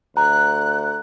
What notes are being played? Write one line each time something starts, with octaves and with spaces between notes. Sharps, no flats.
D2 A#5 F#6